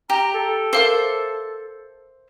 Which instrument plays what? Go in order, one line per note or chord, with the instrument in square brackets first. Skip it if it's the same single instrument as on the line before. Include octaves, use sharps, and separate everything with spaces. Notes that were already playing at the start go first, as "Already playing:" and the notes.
[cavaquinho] G4 [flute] A#5
[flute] A4
[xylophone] A#4 F5 G7 [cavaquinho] C5 E5 D6